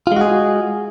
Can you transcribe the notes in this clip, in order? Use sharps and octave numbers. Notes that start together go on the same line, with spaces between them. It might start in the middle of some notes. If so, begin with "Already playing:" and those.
G#3 F4 F#4 G#4